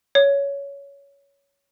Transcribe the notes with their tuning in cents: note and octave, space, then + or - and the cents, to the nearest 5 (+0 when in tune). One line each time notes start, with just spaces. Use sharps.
C#5 +15